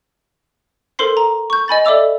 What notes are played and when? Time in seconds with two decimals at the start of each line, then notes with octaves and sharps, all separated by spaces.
0.99 A4 A#4 C5 C6 C7
1.17 A#5
1.50 C#6 G6
1.68 D#5 G#5 B5 A6
1.85 A4 D5 E5 D6 E6 F7